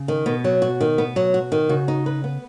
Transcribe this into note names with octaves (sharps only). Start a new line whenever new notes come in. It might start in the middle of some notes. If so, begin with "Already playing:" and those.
Already playing: C#3
D#3
B2 B3
F#3
F#4
D#3
B3
F#3
F#4
D#3
C#3 F#4
D#4
B4
B3